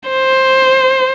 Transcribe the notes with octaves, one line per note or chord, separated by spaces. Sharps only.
C5